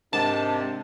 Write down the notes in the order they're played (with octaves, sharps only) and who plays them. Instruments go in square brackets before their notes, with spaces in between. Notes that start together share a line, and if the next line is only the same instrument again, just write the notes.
[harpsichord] G#2 D#3 [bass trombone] C3 [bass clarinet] D4 [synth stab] A5